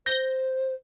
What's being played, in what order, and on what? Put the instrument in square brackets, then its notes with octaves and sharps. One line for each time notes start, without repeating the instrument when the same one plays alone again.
[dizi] C5 [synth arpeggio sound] G6 A#6